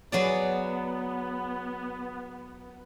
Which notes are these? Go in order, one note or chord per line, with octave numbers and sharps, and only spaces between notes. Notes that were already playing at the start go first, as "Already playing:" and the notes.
F#3 B3 G#4 D5